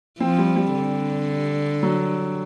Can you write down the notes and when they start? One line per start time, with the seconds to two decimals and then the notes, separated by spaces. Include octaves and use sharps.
0.20 F3 C4
0.38 G3
0.56 G3
0.74 D3
1.83 F#3